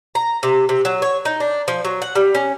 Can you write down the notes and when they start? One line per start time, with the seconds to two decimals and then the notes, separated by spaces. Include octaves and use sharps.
0.15 A#5
0.43 C3
0.69 C3
0.85 F#3
1.02 C#5
1.25 D#4
1.40 D4
1.68 F3
1.85 F#3
2.02 F#5
2.15 G3
2.35 C#4